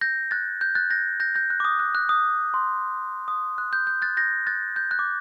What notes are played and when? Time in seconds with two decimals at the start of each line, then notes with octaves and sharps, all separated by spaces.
0.01 G6 A#6
0.31 F#6 A6
0.61 G6
0.75 F#6 A6
0.90 G6 A#6
1.20 G6 A#6
1.35 G6 A#6
1.50 F#6
1.60 D6
1.65 D#6
1.79 F#6
1.95 F#6
2.09 D#6
2.54 C6
3.28 D#6
3.58 F#6
3.73 G6
3.87 G6
4.02 F#6 A6
4.17 G6 A#6
4.47 F#6 A6
4.76 G6
4.91 F#6
4.99 D6